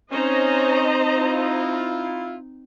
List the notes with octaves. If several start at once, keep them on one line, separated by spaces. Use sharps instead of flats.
C4 C#4 D#4 C5 D#5 A#5
E4 F4